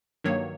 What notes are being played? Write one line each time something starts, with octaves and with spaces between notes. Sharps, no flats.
G2 D#3 F#3 A#3 C#5